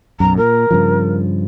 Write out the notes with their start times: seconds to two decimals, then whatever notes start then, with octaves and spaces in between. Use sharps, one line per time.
0.20 B1 F#2 A#5
0.37 A#2 A#4
0.71 G2 C#3 F3